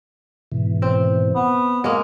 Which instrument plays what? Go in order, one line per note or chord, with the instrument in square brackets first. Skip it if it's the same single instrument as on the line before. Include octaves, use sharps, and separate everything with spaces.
[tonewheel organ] G#2 B2 E3
[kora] C4
[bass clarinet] B3
[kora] G#3 A#3 [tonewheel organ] F5